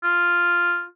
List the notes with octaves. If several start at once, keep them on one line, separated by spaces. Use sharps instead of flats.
F4